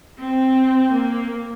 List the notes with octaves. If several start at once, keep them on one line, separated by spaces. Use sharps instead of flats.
C4
A#3